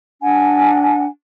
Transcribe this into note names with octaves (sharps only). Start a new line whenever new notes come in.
D4 F#5 G#5